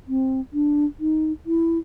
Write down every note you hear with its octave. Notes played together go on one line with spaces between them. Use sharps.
C4
D4
D#4
E4